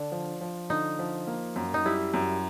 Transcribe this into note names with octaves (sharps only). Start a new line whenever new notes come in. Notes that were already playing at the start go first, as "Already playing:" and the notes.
Already playing: D3 D4
F3
F3
D3 D#4
F3
A#3
F#2
D#4
G3 E4
F#2